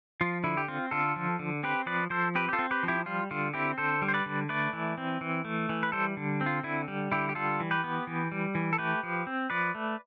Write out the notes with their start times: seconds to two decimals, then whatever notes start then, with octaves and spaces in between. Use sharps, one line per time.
0.21 F3 F4
0.44 D3 E4
0.57 G4
0.68 C4 F4
0.91 D3 F4 A4
1.16 F3
1.39 D3
1.63 C4 G4 B4
1.86 F3 B4 D5
2.10 F3 A4 C5
2.35 C4 G4 B4
2.49 G4
2.53 F4 A4
2.59 C4
2.71 G4 B4
2.83 F3
2.88 E4 G4
3.06 G3 F4
3.31 D3 F4
3.54 C4 E4 G4
3.78 D3 A4 C5
4.02 G3
4.08 C5
4.14 B4 D5
4.26 D3
4.49 A3 B4 D5
4.73 E3
4.98 C4
5.21 E3
5.45 A3
5.69 E3
5.83 B4
5.92 G3 A4 C5
6.17 D3
6.41 C4
6.46 F4
6.64 D3 E4
6.88 G3
7.12 D3 E4 G4
7.29 G4
7.35 G3 F4 A4
7.60 E3
7.71 G4 B4
7.84 B3
8.07 E3
8.32 G3
8.55 E3
8.73 A4
8.78 A3 G4 B4
9.03 F3
9.27 C4
9.50 F3 B4 D5
9.75 A3